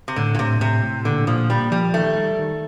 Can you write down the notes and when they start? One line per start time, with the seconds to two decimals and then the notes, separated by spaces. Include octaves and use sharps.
0.08 C3
0.16 A2 D3
0.35 A#2
0.39 A2 C3
0.60 A2 C3
0.82 A2
1.05 A#2 D3
1.27 A#2 F3
1.50 G3 A#3
1.71 F3 G3
1.94 D#3 A3
2.16 G3
2.39 D#3